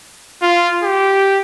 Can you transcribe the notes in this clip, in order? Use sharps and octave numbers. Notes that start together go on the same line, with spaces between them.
F4
G4